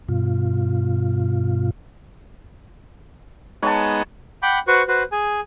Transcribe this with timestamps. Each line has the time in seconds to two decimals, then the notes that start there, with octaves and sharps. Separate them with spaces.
0.09 G2 B2 F4
3.63 G#3 B3 D#4 C#5 A5
4.43 F#5 G5 B5 D6 G6
4.67 F#4 B4 C5 C#6
4.88 F#4 B4 C5
5.12 G#4 G#5